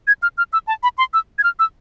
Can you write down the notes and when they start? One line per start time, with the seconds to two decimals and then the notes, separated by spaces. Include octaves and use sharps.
0.07 G#6
0.23 F6
0.38 F6
0.53 E6
0.68 A5
0.83 B5
0.98 C6
1.14 E6
1.38 G#6
1.44 F6
1.59 E6